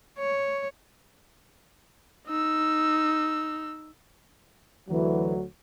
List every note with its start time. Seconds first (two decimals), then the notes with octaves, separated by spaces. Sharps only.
0.19 C#5
2.27 D#4 E6
4.89 D2 E3 F#3